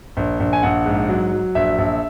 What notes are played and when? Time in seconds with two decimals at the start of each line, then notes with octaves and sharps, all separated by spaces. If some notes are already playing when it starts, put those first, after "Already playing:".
0.17 A#1
0.40 A#1
0.53 G#5
0.63 A#1 F#5
0.86 G#2
1.09 F#3
1.32 F#3
1.55 A#1 E5
1.78 A#1